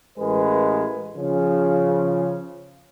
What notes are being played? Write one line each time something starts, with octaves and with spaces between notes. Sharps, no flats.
A1 G#3 A#4 B4
C#3 F3